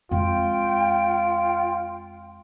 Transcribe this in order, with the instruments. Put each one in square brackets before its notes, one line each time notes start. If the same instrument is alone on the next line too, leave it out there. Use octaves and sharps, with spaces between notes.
[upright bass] F2 G#3 [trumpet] F4 [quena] G5